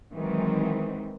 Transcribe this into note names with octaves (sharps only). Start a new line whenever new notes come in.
D#3 E3 F#3 G#3 C4